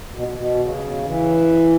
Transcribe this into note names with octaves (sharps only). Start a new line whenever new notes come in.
B2
B2
C#3
E3